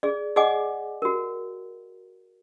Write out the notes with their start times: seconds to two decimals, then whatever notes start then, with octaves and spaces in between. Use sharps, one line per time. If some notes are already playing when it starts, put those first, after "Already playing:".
0.03 G#4 D5
0.36 G#4 D5 D#5 F#5 G#5 D6
1.02 F#4 A#4